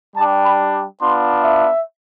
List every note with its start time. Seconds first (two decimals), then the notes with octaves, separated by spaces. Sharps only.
0.16 G3 D4 G4 A5
0.45 B5
1.02 B3 D4 F4 C6
1.44 E5